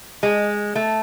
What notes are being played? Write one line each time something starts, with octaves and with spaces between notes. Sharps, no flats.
G#3
A3